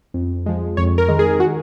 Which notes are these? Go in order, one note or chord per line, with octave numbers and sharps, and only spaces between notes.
F2
F3 G#3
F2 C#5
A#4
D#3 G#3
G#4
F#4